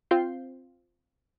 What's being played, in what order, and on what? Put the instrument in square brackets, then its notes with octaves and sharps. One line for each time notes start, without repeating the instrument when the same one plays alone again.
[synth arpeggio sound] C4 F4 G6 C7